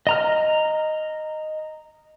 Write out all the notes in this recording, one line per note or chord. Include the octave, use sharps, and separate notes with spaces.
D#5 A#5 F6